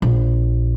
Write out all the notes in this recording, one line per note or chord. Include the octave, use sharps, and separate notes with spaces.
A#1